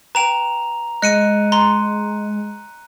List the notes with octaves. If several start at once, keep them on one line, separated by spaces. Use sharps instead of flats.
B4 G5 A#5 F7
G#3 D#5 F#6 C#7 D#7
A#5 C6